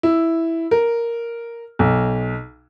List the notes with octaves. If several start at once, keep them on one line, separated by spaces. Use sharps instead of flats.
E4
A#4
B1